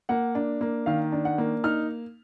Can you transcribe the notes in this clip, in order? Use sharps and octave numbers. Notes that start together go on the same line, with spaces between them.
A#3 F#5
D4
A#3
D#3 F5
D4
F#5
A#3
D#4 F6